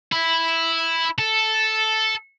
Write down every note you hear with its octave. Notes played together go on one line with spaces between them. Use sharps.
E4
A4